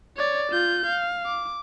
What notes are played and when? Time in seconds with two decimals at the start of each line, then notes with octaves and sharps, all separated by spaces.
0.17 C#5 D5
0.52 F4 G6
0.86 F5
1.26 D6